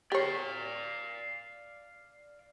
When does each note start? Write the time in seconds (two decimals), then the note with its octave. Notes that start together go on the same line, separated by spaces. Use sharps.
0.12 G4 C#5 D5 F5